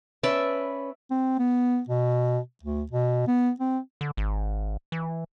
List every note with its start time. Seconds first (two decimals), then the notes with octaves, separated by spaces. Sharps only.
0.23 C#4 B4 D5 E5 A5
1.11 C4
1.39 B3
1.89 B2
2.64 D2
2.92 B2
3.27 B3
3.60 C4
4.01 D3
4.17 G#1
4.92 E3